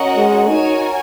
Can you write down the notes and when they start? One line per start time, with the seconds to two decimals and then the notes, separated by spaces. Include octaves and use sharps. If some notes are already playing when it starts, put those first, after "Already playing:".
Already playing: C#4 F#4 A#4 D#5 F#5
0.17 G#3
0.48 D#4 F#4 A#4 C#5 G#5